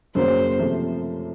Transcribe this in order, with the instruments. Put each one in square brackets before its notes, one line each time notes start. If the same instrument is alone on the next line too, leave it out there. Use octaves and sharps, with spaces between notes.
[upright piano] F#2 C#3 F#3 A#3 [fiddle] C5
[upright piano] C3 F3 A3